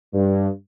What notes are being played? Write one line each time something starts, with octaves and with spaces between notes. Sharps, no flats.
G2